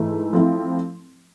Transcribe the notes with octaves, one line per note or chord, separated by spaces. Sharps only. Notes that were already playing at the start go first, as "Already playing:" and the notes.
Already playing: G#2 E3 A3 E4
F3 A3 C4 E4